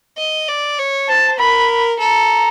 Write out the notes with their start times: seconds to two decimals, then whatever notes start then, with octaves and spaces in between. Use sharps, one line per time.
0.18 D#5
0.48 D5
0.78 C#5
1.08 C5 A5
1.39 A#4 B5
1.99 A4 A#5